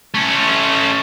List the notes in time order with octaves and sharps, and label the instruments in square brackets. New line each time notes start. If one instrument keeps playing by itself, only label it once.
[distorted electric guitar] A3 C#4